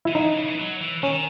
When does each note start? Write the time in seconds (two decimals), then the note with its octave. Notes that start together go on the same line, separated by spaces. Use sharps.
0.05 E3 E4
0.15 F#3 D#4
0.26 E3
0.37 C#3
0.48 E3
0.60 F#3
0.81 E3
1.03 D#3 C#4